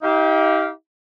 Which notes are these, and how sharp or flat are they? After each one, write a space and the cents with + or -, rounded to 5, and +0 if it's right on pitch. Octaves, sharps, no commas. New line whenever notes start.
D#4 +40 G4 -15 F5 +0